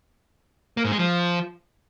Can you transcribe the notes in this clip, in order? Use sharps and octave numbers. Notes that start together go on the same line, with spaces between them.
A#3
G#2
G#3
F3